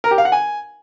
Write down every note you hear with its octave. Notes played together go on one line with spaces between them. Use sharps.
A#4
G4
F5
F#5
G#5